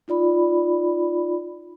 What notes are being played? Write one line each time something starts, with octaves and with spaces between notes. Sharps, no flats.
D#4 F4 D5 B5